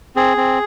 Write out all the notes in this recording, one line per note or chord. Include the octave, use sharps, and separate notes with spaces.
C4 G#4
C4